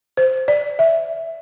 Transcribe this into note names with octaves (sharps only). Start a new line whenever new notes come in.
C5
D5
E5